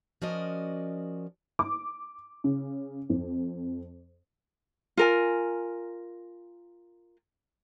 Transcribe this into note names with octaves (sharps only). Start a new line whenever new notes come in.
F3 C#4 F#4 A#4 D5 D#5
D6
C#3
F2
F4 A#4 G#5